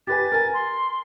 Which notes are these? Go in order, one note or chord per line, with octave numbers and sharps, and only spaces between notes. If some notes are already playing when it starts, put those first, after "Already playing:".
G4 B4 G#5 A6
A#4 G#5
C6